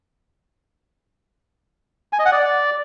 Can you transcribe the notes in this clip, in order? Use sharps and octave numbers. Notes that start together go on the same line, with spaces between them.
G#5
D#5
F#5
D5